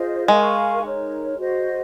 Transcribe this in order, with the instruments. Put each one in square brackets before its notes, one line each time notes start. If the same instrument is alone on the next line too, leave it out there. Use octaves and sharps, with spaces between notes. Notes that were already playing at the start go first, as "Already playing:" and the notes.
Already playing: [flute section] F4 G#4 C5 D#5
[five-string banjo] G#3 [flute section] A#4 F5 G#5 C#6
[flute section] D#4 A#4 C#5
F#4 C5 D#5